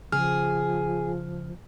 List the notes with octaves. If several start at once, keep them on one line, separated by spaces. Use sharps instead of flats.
C#3 F3 G#4 F6